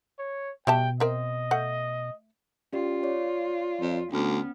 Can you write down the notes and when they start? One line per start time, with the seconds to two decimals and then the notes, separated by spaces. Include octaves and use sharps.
0.19 C#5
0.67 B2 G3 E5 G5 A5
1.00 C4 A#4 D#5 E5
1.51 A3 F#5
2.73 C#4 F4 G4 D5
3.03 C#5 D5
3.81 F2
4.12 D2 B3 C#4 F6